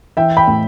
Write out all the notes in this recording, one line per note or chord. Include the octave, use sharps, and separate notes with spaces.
E3 E5 G5
G5 B5
A2